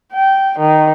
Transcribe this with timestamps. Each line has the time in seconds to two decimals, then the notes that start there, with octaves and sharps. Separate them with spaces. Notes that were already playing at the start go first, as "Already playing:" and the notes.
0.13 G5
0.59 D#3